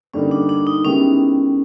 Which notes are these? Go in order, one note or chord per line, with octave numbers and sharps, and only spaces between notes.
G2 D3 G3 A#3 C#4 D#4
D4
D4
D#4
D#3 G#3 B3 C#4 E4 G4